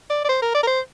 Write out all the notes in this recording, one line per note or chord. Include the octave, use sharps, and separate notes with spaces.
D5
D5
C5
A#4
D5
A#4
C5